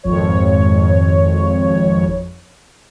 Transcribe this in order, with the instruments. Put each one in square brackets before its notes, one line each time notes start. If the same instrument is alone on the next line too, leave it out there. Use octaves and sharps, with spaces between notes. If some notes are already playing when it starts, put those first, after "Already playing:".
[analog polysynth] G#1 F2 C#5